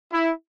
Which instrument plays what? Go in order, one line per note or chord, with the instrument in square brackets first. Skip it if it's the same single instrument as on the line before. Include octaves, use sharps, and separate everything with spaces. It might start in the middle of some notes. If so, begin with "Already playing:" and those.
[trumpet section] E4